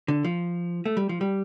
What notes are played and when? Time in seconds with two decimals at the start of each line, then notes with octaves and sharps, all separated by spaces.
0.08 D3
0.24 F3
0.86 A3
0.97 G3
1.09 F3
1.21 G3